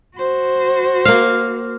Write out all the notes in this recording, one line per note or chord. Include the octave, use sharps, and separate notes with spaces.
F#4 C5
A#3 F5